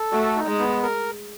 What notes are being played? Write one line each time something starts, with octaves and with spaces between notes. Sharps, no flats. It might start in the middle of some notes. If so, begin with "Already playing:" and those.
Already playing: A4
A3 F#4
D#4
G#3
B3
A#4